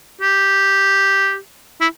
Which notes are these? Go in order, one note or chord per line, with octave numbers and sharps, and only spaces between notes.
G4
E4